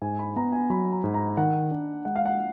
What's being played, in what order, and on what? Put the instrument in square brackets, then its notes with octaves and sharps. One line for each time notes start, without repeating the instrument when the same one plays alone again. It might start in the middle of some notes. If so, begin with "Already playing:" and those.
[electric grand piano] G#2 [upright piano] G#5
[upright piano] B5
[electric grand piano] B3 [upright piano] A#5
[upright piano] G#5
[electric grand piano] F#3 [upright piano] B5
[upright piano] A#5
[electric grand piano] G#2
[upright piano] A#5
[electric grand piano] D#3 [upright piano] F#5
[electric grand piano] D4
[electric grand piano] G#3 [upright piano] F#5
[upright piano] F5
F#5